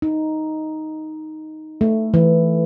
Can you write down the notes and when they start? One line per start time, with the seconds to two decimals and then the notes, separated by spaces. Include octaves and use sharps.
0.02 D#4
1.81 A3
2.14 E3